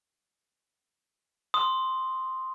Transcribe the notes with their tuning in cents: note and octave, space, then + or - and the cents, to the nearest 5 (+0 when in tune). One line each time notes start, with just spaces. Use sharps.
C6 +0 D#6 +0